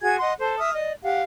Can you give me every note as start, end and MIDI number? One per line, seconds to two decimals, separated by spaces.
0.01 0.17 66
0.01 0.17 68
0.01 0.17 80
0.01 0.17 92
0.19 0.33 75
0.19 0.33 78
0.19 0.33 84
0.39 0.58 69
0.39 0.58 72
0.59 0.73 76
0.59 0.73 87
0.59 0.73 89
0.75 0.94 74
0.75 0.94 75
1.04 1.22 67
1.04 1.22 77
1.04 1.22 78